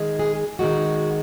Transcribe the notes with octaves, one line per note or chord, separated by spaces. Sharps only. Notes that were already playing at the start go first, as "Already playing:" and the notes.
Already playing: D#3 G#3
G#4
D#3 G#3 F#4